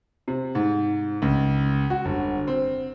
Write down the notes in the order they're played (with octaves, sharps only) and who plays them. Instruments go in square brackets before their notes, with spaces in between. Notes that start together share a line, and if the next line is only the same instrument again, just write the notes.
[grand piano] C3
G#2
C#2
F#4
G1
C4